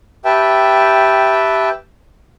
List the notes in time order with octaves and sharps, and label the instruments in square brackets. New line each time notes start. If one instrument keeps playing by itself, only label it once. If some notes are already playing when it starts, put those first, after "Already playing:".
[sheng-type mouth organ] G4 B4 E5 G5 A5